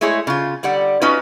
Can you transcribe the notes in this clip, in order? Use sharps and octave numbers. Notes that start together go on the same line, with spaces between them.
G#3 A3 E4 G#4 C#5
C#3 F4
D3 G3 D5 F#5
C#4 D#4 F4 F#4 B4